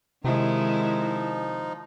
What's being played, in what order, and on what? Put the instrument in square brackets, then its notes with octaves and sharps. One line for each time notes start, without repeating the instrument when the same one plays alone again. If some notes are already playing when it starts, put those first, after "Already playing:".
[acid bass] C3 [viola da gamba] D#3 G#3 E4 [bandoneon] F3 D#4